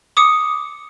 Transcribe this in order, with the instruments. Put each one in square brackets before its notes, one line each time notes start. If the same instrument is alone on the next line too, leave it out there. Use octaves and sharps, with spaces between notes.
[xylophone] D6 D#6 C#7